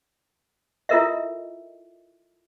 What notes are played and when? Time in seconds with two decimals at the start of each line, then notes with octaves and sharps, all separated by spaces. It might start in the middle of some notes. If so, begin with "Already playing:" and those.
0.89 E4 F4 A4 A#4 D#5 E5